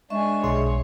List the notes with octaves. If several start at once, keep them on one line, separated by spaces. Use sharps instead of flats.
G#3 D4 D#5 E5 G#5 C#6
B1 G#4 C#5 C6